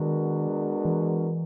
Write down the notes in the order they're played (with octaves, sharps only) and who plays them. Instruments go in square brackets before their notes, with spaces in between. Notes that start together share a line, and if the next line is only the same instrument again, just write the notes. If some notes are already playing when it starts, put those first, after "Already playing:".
Already playing: [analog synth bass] D#3 [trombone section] G#3 B3 D4 F#4 A#4
[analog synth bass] E3